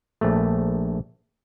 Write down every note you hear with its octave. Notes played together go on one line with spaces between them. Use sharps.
A#1 A3